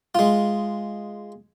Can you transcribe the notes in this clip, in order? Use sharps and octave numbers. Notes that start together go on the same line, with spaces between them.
G#3 F4